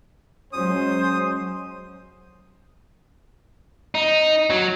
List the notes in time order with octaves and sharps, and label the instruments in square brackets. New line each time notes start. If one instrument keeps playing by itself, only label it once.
[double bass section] F#3 G#3 C#4 [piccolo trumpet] C5 [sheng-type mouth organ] D#6
[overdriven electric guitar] D#4
F#3